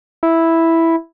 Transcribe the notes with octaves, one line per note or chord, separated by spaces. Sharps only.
E4